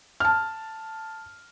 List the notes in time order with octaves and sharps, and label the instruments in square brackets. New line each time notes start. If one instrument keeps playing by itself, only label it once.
[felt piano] A5 F6